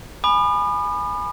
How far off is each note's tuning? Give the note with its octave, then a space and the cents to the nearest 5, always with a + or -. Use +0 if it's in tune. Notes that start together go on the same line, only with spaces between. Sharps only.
G#5 +0 B5 +0 D#6 -45